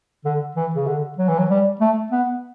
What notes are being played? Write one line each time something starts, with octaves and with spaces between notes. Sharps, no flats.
D3
E3
C#3
D3
F#3
E3
F#3
G3
A3
B3